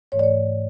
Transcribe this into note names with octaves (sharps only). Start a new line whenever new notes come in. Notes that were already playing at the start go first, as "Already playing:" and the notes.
G#2 E3 A3 C#5
D5
C#5